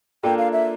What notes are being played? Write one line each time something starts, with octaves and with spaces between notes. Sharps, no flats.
A#3 D4 F4 A4 G5
F5
E5